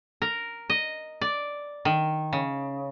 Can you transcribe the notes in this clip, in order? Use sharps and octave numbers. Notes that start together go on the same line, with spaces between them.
A#4
D#5
D5
D#3
C#3